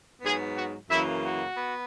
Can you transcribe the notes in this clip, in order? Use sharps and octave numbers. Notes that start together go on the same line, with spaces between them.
G#2 F#3 B3 G#4
F#4
F#2 C#3 E3 A#3 E4
F#4
B3